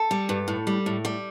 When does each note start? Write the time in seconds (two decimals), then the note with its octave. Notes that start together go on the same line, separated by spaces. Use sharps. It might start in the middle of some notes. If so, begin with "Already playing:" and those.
Already playing: A4
0.11 G3
0.29 G2
0.48 A2
0.67 G3
0.86 A2
1.05 G3